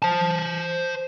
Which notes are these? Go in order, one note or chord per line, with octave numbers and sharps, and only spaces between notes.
C5 A5